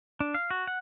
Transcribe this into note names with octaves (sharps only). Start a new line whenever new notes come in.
D4
F5
F#4
F#5